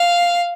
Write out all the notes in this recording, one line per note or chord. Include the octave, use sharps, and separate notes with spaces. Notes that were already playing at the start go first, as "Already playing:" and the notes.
Already playing: F5